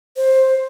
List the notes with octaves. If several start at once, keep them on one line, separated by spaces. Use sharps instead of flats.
C5